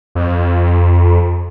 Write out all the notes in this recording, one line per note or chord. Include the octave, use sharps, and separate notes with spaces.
F2